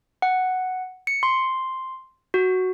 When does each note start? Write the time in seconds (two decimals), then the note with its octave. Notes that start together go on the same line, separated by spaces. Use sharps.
0.22 F#5
1.07 C#7
1.23 C6
2.34 F#4